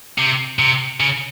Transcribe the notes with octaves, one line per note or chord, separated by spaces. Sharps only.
C3
C3
C#3